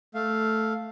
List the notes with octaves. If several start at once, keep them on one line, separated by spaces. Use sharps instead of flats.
A3 F5